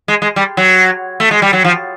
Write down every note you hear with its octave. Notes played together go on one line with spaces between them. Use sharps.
G#3
G#3
G3
F#3
A3
G#3
G3
F#3
F3